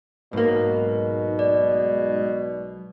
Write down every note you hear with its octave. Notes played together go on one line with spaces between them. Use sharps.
B1 G#2 B2 A#3
D5